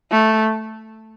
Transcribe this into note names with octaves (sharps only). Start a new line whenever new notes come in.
A3